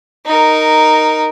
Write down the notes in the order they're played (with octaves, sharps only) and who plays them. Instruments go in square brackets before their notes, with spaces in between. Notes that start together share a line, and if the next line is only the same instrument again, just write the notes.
[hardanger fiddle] D#4 A#4